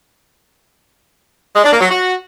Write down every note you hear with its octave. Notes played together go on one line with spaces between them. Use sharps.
G#3
D4
A#3
F#3
F#4